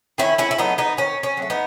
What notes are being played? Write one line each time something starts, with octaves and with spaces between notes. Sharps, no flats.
D#3 C#4 E4
C#4 E4
E4
F#3 A3 B3 D#4
B3 D#4
D#3 C#4
C#4
F#3 A3
B3 D#4